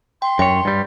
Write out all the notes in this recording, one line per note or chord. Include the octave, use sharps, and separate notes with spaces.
G5 C6
F#2 C#5 G5
G2 G3